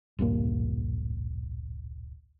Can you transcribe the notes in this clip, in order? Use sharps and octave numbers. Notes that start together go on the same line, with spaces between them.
D1 A#1 G2 A#3